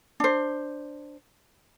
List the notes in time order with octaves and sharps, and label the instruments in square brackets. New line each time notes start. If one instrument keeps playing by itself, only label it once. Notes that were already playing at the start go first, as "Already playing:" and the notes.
[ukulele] D4 C5